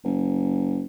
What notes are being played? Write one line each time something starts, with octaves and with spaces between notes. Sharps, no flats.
F#1